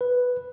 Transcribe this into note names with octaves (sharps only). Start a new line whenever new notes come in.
B4